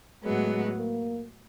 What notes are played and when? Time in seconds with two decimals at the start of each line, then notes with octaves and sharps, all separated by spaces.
0.24 A2 F#3 G#3 B3
0.77 A#3